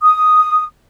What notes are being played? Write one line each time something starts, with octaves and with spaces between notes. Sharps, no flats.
D#6